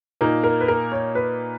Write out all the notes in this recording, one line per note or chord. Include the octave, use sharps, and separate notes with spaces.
A#2 A#3 D#4
A#4
B4
A#4
C#5
B4